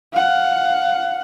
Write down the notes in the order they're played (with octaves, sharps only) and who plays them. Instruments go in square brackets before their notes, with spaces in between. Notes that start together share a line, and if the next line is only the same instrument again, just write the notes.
[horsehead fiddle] F5 F#5